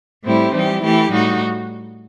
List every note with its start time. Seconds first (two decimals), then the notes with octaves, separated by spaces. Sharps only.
0.25 A2 G3 C4 E4 G4
0.55 E3 G3 D#4 G4
0.83 E3 A3 E4 G4
1.12 A2 G3 D#4 F#4